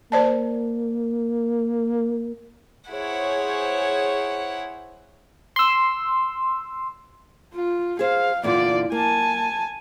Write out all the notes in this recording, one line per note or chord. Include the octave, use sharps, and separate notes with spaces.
A#3 C5 D5 A5
E4 G#4 C5 C#5 F#5
C6 E6
F4
G#4 C5 F5
E2 A#2 D3 F4 D5
A#3 G#5 A5